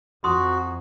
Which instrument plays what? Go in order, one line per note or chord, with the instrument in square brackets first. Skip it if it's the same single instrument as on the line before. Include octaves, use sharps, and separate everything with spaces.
[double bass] F2 [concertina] F#4 [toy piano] C6 D#6